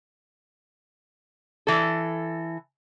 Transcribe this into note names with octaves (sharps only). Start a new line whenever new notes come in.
E3 A4